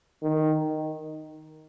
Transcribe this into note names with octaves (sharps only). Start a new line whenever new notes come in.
D#3